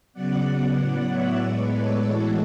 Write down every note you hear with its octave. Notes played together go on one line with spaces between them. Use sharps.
C#3 F#3 B3 D5 F#5
A2 F#3 B3
C#5 E5
A2 G#3 B3 B4 D5
A4 C#5
A2 E3 G#3 F#4 A4